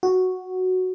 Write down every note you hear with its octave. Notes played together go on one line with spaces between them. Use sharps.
F#4